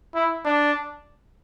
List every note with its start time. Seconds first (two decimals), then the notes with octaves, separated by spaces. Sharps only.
0.15 E4
0.45 D4